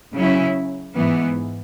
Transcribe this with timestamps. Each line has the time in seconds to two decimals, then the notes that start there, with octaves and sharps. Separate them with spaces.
0.14 C#3 F#3 C#4 E4
0.96 G#2 E3 B3